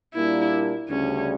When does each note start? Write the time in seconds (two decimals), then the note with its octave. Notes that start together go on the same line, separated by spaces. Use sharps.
0.15 A#2 G3 A#3 D4 E4
0.89 D2 C#3 G3 C#4 D4